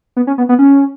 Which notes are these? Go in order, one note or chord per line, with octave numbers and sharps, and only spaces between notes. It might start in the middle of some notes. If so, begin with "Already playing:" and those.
B3
C#4
B3
B3
C#4